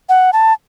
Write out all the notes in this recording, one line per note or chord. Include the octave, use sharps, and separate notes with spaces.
F#5
A5